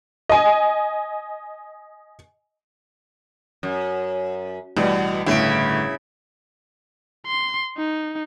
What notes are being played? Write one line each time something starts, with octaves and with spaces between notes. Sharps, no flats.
D#5 G#5
F#2
A1 B2 G3
G1 A2 C#3 E4 D7
C6
D#4